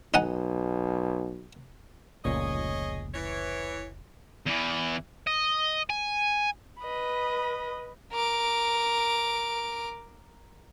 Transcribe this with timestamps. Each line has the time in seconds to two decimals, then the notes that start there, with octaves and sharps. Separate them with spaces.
0.14 B1 D#4 F#5 G#5
2.25 F1 C#2 A#2 G#4 C#5 D#5
3.14 E3 C#5
4.46 E2 E3
5.27 D#5
5.90 G#5
6.82 B4 D#5 B5
8.12 A#4 D6